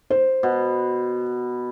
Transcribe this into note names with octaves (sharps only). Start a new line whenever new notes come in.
C5
B2